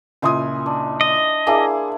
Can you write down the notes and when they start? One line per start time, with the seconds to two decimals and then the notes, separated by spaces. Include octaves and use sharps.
0.22 C#2 A#2 E4 G#5 C6 D#6
0.66 D4
1.01 D#5
1.47 A#3 D4 E4 G#4